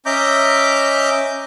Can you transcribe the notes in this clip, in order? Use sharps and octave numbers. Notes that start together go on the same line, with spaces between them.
C#4 D#5 E5 A#5 D6 G6